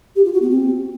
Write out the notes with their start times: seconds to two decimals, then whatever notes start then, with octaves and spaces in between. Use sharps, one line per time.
0.16 G4
0.25 F4
0.33 F#4
0.42 B3
0.51 C4